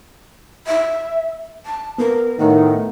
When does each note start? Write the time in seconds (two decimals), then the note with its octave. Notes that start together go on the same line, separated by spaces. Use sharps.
0.67 E5
1.66 A5
1.98 B3 A#4
2.39 A2 D#3 F#5